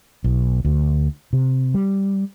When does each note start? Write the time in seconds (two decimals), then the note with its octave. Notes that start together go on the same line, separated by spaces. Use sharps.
0.24 B1
0.65 D2
1.33 C3
1.74 G3